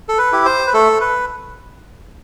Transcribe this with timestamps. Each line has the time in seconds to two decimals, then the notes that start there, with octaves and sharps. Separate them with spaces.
0.09 A4
0.18 B4
0.32 E4 G4
0.45 C5
0.67 B4
0.74 A3 A4
1.01 B4